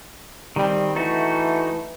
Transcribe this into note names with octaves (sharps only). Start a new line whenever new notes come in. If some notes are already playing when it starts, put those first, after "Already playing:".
D#3 G3 C4
E3 A3 D#4 F#4